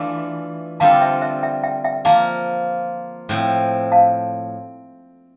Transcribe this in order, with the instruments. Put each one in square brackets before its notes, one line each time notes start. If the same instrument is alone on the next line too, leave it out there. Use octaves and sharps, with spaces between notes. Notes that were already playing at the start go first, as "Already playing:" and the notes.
Already playing: [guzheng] E3 A3 D4 F4
[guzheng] D3 G3 C4 F4 A4 [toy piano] F5 A5
[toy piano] E5 G5
C5 E5
E5 G5
E5 G5
E5 G5
[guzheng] F3 A#3 F4 [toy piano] F5 A5
[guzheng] A2 F3 C4
[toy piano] F5 A5